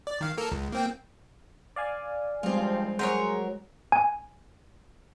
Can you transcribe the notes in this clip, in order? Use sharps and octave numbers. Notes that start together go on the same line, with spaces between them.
D5
D#3 F5
A#3 A4 A#4
C#2
A#3 C4 G5
D5 F5 G#5
C#2 G2 F3 G3 G#3 C4 F4
F#3 G#4 A#4 C5 C#5
G#5